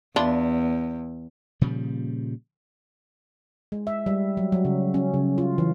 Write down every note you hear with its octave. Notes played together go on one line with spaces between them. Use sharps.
E2 D4 E4 F4
A#2 C#3 F3 G3
G#3
E5
G3
F#3
F#3
C#3
C#4
C#3
F4
E3